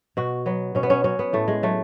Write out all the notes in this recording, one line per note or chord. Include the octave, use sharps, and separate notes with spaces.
B2 F#4
F#3 B3
B2 C#4
B3
C#4
F#3 C#4
B3
A2 A3
G#3
F#3 A3